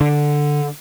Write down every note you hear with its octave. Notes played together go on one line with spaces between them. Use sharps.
D3